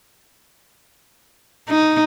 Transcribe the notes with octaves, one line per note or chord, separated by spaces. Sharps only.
D#4